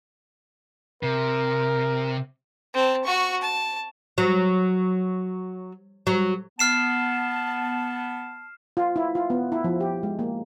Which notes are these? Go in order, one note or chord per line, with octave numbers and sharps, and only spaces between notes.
C3 A#4
C4 A5
F#4 C#6
A5
F#3
F#3
B3 A5 F6 C7 E7
F4
E4
F4
B3
E4
F3
G4
G#3
A#3